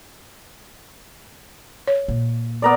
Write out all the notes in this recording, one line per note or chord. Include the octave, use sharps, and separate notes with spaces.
C#5
A#2
B3 A#4 D5